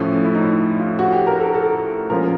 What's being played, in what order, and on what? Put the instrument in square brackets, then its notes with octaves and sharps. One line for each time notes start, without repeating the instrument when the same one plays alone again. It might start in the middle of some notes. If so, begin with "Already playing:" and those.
Already playing: [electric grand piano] A2 F3 A3 [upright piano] C#4
[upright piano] E4
D#4
E4
F4
F#4
G4
A#4
A4
A4
[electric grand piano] A#2 F3 G#3 C#4 F4 [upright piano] A#4